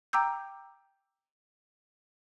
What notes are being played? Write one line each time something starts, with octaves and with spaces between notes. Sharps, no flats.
G5 A#5 D6 E6 G6